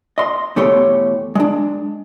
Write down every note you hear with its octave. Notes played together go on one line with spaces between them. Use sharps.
D#5 C6
E2 B2 A3 G4 C#5 C6
G#3 D4